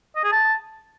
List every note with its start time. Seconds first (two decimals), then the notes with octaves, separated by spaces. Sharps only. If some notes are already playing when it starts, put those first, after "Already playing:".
0.16 D#5
0.24 G#4
0.32 A5